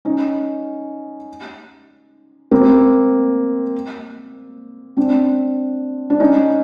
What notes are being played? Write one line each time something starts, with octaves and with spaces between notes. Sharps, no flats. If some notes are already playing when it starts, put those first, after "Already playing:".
C#4 D#4
A#3 C4
C4 D4
D4
C#4 D#4